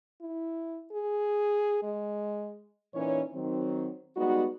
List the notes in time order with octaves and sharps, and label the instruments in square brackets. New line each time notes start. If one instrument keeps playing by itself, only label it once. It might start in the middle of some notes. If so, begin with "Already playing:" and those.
[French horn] E4
G#4
G#3
[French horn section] A#2 E3 C#4 D#4 C#5
D#3 F#3 C4
G3 G#3 B3 D#4 F#4